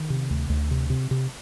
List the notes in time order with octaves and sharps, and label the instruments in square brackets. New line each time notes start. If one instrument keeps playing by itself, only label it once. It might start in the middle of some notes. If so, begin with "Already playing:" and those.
Already playing: [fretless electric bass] D#3
C3
D2
D2
C3
C3
C3